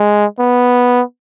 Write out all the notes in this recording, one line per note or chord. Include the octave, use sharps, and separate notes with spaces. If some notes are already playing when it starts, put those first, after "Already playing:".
Already playing: G#3
B3